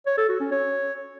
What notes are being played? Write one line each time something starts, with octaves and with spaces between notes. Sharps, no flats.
C#5
A4
F#4
C#4
C#5